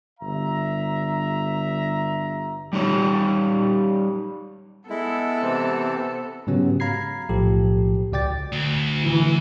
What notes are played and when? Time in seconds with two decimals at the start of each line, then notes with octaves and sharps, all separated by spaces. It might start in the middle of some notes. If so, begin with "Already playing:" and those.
0.20 G1 E5 A#5
2.73 G3 D#4 G4 C#5
4.90 G#3 B3 E4 A4
5.42 C3 E3 C4
6.47 G#2 C#3 F#3 B3 C#4 G4
6.80 F5 A#5 B5 G#6 C7
7.29 B1 A2 F3 G4 A4
8.12 C#2 F#4 D5 G5 D6 A6
8.53 D2
9.04 E3